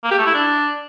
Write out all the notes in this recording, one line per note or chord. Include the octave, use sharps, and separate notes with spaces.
A#3
G4
A3
E4
D4